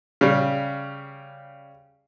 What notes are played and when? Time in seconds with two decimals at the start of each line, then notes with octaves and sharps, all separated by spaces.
0.21 C#3 G3